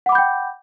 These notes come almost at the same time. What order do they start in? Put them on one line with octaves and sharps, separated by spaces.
F#5 D6 B5 G6 G5